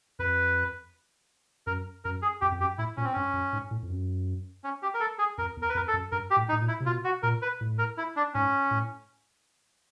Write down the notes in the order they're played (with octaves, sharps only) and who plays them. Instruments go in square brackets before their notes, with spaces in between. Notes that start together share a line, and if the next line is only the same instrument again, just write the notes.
[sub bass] F2 [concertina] B4
[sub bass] F#2 [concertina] A#4
[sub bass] F#2 [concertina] A#4
[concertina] G#4
[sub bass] F2 [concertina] G4
[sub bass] F2
[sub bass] F#2 [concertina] G4
[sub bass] A2 [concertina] E4
[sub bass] A#2 [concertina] C#4
[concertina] C4
[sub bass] G2 [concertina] C#4
[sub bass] F#2
G#2
A2
F2
F#2
[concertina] C#4
G4
A#4
A4
G#4
[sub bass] F2 [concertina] A#4
[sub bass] E2
[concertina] A#4
B4
[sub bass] F2 [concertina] A#4
[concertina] A4
[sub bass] F#2
[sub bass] G2 [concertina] A#4
[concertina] G4
[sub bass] A2
[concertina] D#4
[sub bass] A2
A#2
[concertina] E4
[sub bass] C3
[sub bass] B2 [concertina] F4
[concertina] F#4
[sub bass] A#2 [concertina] A#4
[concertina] B4
[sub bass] A2
[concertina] A#4
E4
D4
[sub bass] G#2 [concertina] C#4
[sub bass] A2